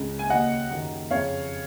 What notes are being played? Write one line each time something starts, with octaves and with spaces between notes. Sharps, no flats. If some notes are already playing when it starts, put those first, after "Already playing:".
Already playing: C#2 C#3
G#5
D#2 C#3 D#5 F#5
F#2 D#3
F2 C#3 C#5 F5